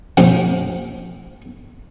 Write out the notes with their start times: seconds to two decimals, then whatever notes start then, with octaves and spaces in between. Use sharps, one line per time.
0.17 A#1 F2 A2 C3